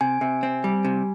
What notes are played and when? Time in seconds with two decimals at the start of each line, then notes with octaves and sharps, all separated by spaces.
0.01 C3 G#5
0.21 C3
0.43 C4
0.64 G3
0.84 C3